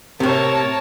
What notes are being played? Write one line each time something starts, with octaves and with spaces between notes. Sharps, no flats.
A2 C3 A#4 C#5 A5